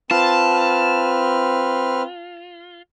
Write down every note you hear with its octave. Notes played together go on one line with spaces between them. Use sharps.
C4 F4 B4 A5 F6